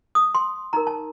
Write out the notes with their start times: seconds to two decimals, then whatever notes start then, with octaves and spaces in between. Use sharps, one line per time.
0.15 D#6
0.35 C6
0.73 D#4 A#4 A#5
0.87 A5